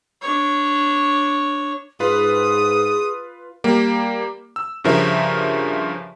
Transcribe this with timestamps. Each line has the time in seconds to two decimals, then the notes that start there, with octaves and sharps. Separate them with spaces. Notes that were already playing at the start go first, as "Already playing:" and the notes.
0.22 D4 C#5
2.00 G#2 F4 G#4 B4 D#6
3.64 G3 A#3
4.56 E6
4.84 G2 C#3 F3 A#4 C5 E5